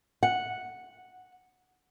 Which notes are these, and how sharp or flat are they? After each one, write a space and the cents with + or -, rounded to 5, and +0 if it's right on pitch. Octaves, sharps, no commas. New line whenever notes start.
F#5 -5